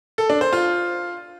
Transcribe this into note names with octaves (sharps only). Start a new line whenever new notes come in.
A4
D4
C5
F4